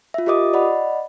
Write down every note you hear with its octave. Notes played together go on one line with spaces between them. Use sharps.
F4 E5
F4 G4 A#4 D#5 D6 D#6
D5 D#5 F#5 B5